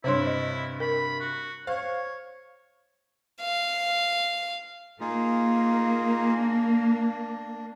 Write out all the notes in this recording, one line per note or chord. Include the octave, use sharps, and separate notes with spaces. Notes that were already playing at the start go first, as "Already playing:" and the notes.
G2 C3 E4 C5 C#5 C6
D#5
A#4 B5
F#4
C5 C#5 F5
F5
A#3 D#4 F4 G#4
D4